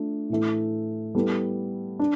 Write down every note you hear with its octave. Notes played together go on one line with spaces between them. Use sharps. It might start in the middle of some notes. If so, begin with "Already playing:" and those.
Already playing: A3 D4 F4
A2 E3 A3
G3 B3 E4 A4
D4